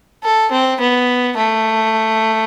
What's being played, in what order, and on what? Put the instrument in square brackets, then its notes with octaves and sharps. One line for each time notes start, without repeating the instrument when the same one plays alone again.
[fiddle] A4
C4
B3
A3